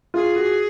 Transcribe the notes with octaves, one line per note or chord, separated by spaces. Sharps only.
F4 G#4
F#4